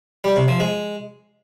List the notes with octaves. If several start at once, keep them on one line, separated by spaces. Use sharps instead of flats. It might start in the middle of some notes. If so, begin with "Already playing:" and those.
G3
C3
F3
G#3